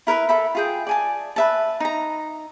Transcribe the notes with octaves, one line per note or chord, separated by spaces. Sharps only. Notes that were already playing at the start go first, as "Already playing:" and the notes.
E4 A#4 B4 E5
A4 E5 B5
F4 G#4 G5
D5 G#5 A5
B4 E5 A5
D#4 A#5